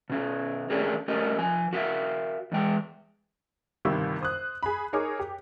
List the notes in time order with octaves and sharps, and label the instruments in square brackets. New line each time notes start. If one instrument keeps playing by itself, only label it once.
[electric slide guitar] B2 C#4
A3 C#4 D4 G4 G#4 A#4
A3 C#4 G4 A#4 D#5
F3 G#5
F#4 A#4 E5 F5
E2 G#3 G5
[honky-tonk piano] G1 C3 D#3 G3 E6
C5 D#6 F#6
G#4 B5
D#4 G#4 A#4 C#5 D6
G4